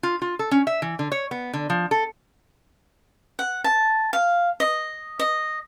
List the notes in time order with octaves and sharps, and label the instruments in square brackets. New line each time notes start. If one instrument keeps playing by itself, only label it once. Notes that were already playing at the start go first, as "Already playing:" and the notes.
[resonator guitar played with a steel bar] F4
F4
A4
C#4
E5
E3
D3
C#5
B3
D3
F3
A4
[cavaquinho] F#5
A5
F5
D#5
D#5